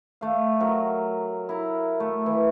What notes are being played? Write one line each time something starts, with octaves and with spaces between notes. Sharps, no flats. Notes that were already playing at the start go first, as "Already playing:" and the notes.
A3 F5
F#3 A#4
E4 A#4
A3
E3